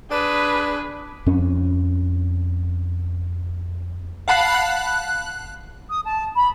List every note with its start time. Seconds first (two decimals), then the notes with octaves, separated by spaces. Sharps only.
0.11 D4 G#4 B4
1.26 F2 C#4
4.28 F5 F#5 A5 B5 F#6 C7
4.55 F#6
5.90 D#6
6.05 A5
6.36 B5